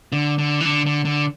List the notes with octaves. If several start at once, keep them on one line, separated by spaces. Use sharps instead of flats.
D3
D3
E3
D3
D3
D3